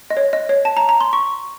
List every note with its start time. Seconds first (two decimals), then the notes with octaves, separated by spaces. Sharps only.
0.10 D#5
0.17 C#5
0.33 D#5
0.49 C#5
0.65 A5
0.77 A#5
0.89 A#5
1.01 C6
1.13 C#6